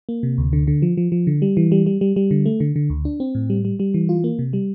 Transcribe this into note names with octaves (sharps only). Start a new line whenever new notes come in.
A#3
C3
D2
D3
D3
F3
F3
F3
D3
G3
E3
G3
G3
G3
G3
D3
A3
D3
D3
D2
D4
C4
A2
G3
G3
G3
E3
F4
A#3
C3
G3